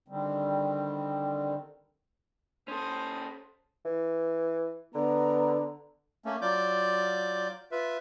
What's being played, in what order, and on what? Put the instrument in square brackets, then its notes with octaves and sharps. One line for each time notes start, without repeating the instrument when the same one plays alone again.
[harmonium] D3 D#3 G3 C4
[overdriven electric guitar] C#4 A4 [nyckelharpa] C5 D#6
[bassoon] E3
[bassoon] D3 [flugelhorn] B3 [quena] A#5
[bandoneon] A3 A#3 C#4
F#3 F4 D5 D6 G6
F4 B4 E5